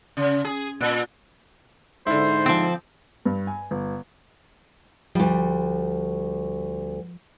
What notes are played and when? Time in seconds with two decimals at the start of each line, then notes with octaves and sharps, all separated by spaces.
0.17 C#3
0.44 G#4
0.81 A#2
2.07 G#2 D3 E4 C5
2.46 F3 C4
3.25 G2
3.47 G#5
3.71 G1
5.15 D2 F3 G3